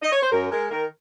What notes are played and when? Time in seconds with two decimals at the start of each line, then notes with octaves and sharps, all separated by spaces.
0.02 D#5
0.12 C#5
0.23 C5
0.32 F#2 A#4
0.51 G#3 A#4
0.71 D#3 A#4